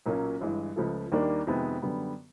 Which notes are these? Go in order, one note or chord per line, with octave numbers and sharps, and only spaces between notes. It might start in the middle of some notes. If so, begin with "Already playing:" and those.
B1 A#2 F#3 A#3 C#4
G1 G2 E3 G#3
C#2 C#3 F3 A3
D#2 D#3 G3 A#3 D4
F2 C3 D#3 G#3 B3
F#2 D3 G3 B3